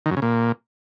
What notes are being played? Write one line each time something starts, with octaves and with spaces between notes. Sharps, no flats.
D#3
F#2
C#3
A#2